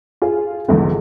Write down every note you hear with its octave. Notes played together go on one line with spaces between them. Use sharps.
F4 G#4
A#1 E2 G#2 D3